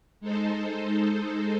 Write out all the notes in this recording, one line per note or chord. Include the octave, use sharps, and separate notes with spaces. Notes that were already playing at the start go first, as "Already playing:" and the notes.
G#3 D#4 A4 C5